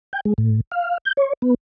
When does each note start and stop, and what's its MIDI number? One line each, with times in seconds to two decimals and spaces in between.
0.13 0.20 79
0.25 0.34 56
0.38 0.61 45
0.72 0.98 77
1.05 1.13 91
1.17 1.33 73
1.42 1.54 59